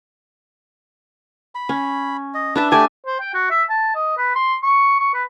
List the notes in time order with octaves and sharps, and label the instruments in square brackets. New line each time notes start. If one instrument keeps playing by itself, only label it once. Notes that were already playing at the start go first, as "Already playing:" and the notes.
[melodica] B5
[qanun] C#4
[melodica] D#5
[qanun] D4 E5 A5 [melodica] B4
[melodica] A3 G4 A5 [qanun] D5 G#5
[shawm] C5
G5
F#4
E5
A5
D#5
B4
C6
C#6
C#6
B4